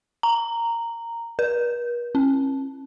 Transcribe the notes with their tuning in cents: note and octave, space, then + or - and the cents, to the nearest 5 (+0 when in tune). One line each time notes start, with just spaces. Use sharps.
A#5 -10
B4 -45
C#4 -35